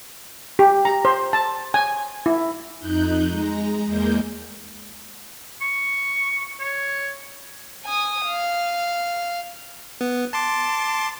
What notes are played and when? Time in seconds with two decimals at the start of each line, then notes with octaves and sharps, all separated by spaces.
0.59 G4
0.85 A#5
1.05 C5
1.33 A5
1.74 G#5
2.26 E4
2.79 F2 D#4 F#6 G6
3.29 G#3 A#5
3.85 E2 G#3 A#3 G6
5.61 C#6
6.59 C#5
7.85 G#5 D#6
8.26 F5
10.01 B3
10.33 A5 C6 D6